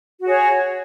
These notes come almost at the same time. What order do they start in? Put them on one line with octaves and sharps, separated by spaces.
F#4 G#4 C#5